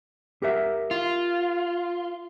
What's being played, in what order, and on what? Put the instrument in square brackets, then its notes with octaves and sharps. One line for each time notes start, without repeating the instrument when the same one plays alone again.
[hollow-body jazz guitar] G4 A#4 E5
[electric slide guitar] F4